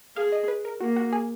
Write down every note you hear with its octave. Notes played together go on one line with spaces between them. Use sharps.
G#4 F5
D#5
B4
A#4
A#3 F#4
F#4
G#4